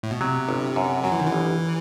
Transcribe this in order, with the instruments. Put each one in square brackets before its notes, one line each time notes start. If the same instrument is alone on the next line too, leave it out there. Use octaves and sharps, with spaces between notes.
[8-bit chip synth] A2
B2
[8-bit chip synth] C3 [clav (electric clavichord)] F#3
[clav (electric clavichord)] G1
F#2
[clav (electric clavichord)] F#2 [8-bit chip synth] F#3
[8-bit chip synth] E3
D#3
E3
[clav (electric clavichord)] G1